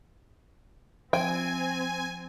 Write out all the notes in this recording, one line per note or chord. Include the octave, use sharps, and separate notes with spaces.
F3 C4 C5 E5 G5 G#5